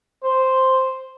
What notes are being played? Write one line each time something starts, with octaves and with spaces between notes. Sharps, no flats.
C5